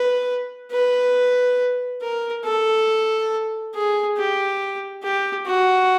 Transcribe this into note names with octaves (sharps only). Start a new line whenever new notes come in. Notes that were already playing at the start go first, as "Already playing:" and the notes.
Already playing: B4
B4
A#4
A4
G#4
G4
G4
F#4